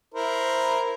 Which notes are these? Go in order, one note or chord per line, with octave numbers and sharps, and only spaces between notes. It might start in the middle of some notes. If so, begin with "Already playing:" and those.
E4 A#4 C5